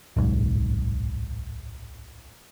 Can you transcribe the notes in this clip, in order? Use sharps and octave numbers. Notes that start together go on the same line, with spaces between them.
D1 B1 G#2